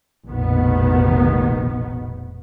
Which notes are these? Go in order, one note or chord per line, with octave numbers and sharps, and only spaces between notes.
F1 A#1 B2 D#3 B3